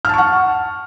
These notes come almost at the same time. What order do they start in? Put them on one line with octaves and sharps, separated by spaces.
F6 A5 C#6 F#5